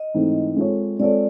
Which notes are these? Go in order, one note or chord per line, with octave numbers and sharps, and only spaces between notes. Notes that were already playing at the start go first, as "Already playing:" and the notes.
Already playing: D#5
G#2 E3 A3 C4 D#4
G#3 C4 F4 A4 C#5
G#3 C4 F4 A4 C#5 D5